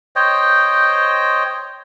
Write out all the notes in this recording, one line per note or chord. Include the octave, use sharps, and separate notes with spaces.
C5 C#5 D#5 G5